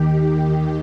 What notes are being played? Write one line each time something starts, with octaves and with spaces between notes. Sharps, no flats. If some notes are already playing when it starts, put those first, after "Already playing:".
Already playing: D#2 D#3 G4